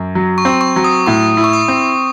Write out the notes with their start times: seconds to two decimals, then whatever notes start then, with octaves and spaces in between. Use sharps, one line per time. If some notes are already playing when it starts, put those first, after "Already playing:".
Already playing: F#2
0.15 F#3
0.38 C#6
0.45 C4
0.61 C#6
0.76 F#3
0.84 D#6
1.06 A2 C#6
1.37 E4
1.44 C#6
1.53 D#6
1.68 C4